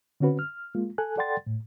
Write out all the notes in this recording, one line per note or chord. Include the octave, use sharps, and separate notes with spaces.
D3 C4 C#4 F#4 B4
F6
G#3 A#3 F4
A4 G#5 F#6
A4 D5 F#5 G5 C6 A6
A2